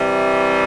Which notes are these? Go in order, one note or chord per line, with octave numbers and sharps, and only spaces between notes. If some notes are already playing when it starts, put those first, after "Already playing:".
Already playing: C3 E3 G3